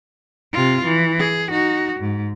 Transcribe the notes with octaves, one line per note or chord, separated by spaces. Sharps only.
C3 F4
E3
G#4
D#4 F#4
G#2